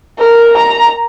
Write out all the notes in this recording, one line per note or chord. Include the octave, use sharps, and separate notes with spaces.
A#4
A#5